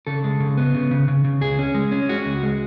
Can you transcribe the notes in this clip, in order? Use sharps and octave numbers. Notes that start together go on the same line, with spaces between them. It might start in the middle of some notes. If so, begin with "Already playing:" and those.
C#3 A4
G#3
C#3
B3
C#3
C#3
C#3
C#3
C#2 G#4
C#4
G#3
C#4
G#3 F#4
C#2
G#3